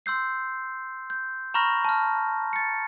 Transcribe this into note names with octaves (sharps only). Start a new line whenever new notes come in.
C6 E6 G6 C7
G6
A#5 B5 C#6 F6 A#6
A5 F6
A6 C#7